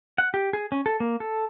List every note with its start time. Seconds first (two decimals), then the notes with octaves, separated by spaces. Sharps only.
0.18 F#5
0.34 G4
0.53 G#4
0.72 C#4
0.86 A4
1.00 A#3
1.20 A4